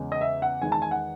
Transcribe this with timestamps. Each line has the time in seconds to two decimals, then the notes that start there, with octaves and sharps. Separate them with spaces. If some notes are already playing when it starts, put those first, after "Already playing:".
Already playing: E2 C#3 G#3
0.12 D#5
0.21 E5
0.42 F#5
0.62 E2 D#3 G#3 G#5
0.72 A5
0.82 G#5
0.91 F#5